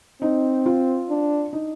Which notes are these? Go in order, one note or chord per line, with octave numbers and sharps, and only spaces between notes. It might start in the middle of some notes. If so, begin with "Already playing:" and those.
C4 D#4
F4
D4
D#4